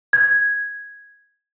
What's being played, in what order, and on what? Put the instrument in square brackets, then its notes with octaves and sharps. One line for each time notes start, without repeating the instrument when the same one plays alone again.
[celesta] G#6